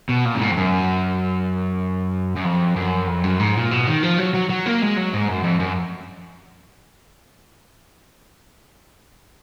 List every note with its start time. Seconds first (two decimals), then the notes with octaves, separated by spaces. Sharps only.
0.09 B2
0.25 A#2
0.35 F#2
0.41 G#2
0.51 F2
0.57 F#2
2.37 F#2
2.45 F2
2.76 F#2
3.08 F2
3.24 F#2
3.40 G#2
3.55 A#2
3.71 B2
3.87 D#3
4.03 F3
4.18 F#3
4.34 F#3
4.49 F#3
4.66 A#3
4.82 G#3
4.96 F#3
5.13 G#2
5.28 F#2
5.44 F2
5.60 F#2